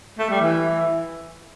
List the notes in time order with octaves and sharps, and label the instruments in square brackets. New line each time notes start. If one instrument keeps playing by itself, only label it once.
[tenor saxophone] A3
G3
E3